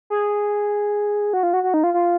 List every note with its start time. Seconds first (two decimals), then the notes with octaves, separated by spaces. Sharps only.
0.10 G#4
1.33 F#4
1.43 F4
1.53 F#4
1.63 F#4
1.74 D#4
1.84 F4
1.94 F4